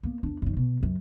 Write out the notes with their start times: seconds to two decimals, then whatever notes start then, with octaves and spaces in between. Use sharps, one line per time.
0.03 A#3 B3
0.23 E2 D4
0.42 F#2 D#3
0.57 B2
0.80 C#2 F#2